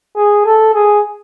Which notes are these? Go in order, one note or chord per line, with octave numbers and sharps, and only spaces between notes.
G#4
A4
G#4